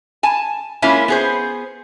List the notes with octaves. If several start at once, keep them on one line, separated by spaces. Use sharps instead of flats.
G#5 A5
G#3 A#3 C#4 E4 F4
B3 G#4 C5